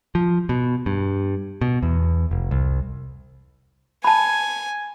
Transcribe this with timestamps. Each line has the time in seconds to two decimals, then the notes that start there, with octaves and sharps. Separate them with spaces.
0.15 F3
0.49 B2
0.86 G2
1.61 B2
1.83 E2
2.31 F1
2.51 C2
4.04 G#5 A5 B5